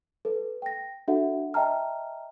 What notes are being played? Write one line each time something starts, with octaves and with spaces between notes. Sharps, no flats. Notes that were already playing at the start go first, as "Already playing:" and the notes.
A4 B4
G5 A#6
D4 F#4 A4 E5 F#5
D#5 E5 G5 A5 A#5 F6